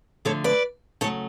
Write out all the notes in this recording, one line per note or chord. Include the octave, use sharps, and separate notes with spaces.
D3 F3 A3 A4 C#5
B4 D5
C#3 F#3 A3 A4 C#5